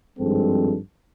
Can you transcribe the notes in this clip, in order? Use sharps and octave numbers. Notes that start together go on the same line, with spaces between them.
G#1 G2 F3 G#3 C4 A4